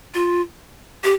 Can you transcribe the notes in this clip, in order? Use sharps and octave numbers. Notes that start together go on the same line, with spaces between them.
F4
G4